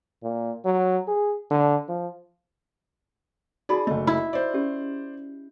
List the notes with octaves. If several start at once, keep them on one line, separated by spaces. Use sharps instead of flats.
A#2
F#3
G#4
D3
F3
D#4 F#4 G#4 D5 B5
F#1 A3 D#5
E4
C5 D5
C#4 G4